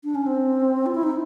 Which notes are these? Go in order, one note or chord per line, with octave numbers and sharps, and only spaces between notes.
D4
C#4
C4
F4
E4
D#4